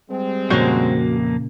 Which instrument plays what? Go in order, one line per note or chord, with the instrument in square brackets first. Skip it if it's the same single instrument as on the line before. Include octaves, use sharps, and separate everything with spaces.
[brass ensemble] G3 G#3 C4
[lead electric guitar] F2 A#3 [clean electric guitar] A#2 C#3 [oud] F#4 C5 C#5